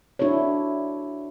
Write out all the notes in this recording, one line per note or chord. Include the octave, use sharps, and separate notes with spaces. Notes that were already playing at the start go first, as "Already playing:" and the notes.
D4 E4 F#4 A4 C#5